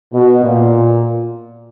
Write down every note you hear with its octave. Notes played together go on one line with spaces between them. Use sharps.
B2
A#2